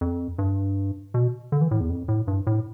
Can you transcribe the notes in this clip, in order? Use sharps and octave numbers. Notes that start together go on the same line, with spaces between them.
F2
G2
B2
D3
E3
A2
E2
F2
A2
G2
A2